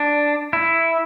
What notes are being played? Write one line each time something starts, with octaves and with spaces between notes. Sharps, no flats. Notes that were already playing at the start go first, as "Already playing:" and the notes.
Already playing: D4
E4